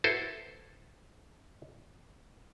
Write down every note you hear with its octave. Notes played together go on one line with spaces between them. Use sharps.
E4 F#4 A4 B4 C5